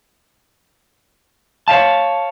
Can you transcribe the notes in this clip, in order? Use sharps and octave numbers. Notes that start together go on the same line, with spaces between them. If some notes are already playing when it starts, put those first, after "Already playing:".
C#5 E5 F5 A5